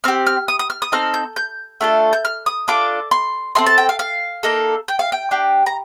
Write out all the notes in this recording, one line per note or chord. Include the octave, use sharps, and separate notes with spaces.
C4 G4 F6
F6
D#6
D#6
F6
D#6
C4 D#4 A4 F6
G6
G6
A3 D4 F4 A4
G6
F6
D#6
D4 F4 A4 D6
C6
C4 D#4 A4 C6
A5
G5
F5
F5
A#3 D#4 A4
G5
F5
G5
D4 G4
A#5